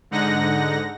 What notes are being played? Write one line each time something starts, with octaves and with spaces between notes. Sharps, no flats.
G#2 D3 D#4 F#5 A#6